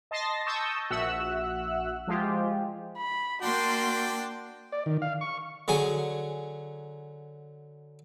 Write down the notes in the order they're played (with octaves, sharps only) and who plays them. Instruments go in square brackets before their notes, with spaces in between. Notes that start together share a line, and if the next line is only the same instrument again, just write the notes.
[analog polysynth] D#5 A5 C6 A6 A#6 C7
A5 C#6 D#6 E6 G6 A#6
A#1 F#4 E5 F#5 E6 F#6
F3 G#3 F4 G4
[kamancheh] B5
[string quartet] A#3 C6 [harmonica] D4 D5 G5 [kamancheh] F#4
[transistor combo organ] D5
D#3
F5
C#6
[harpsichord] D3 F#3 G#4 G#5